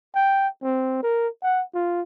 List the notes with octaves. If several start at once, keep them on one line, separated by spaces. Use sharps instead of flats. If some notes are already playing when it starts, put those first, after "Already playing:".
G5
C4
A#4
F#5
F4